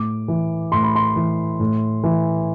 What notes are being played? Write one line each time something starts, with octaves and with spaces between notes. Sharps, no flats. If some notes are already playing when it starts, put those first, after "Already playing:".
Already playing: A2 D6
E3
A2 C6
B5
C6
E3
A2
E3